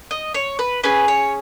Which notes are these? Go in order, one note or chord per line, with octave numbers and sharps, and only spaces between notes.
D#5
C#5
B4
C#4 G#4 B4
C#5